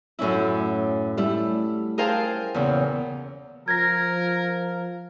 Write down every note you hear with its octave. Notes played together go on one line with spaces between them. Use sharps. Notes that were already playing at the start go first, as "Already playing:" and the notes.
F#2 A2 C#4 E4
G3 A3 E4
G#4 A#4 C5 F5 G5 A5
E2 A#2 C#3
F3 A#4 G#6 A#6